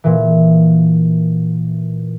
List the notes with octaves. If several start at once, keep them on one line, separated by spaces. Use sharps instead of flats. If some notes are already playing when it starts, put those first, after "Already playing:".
A#2 E3